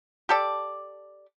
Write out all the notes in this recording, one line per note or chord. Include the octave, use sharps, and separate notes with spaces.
G4 A4 D5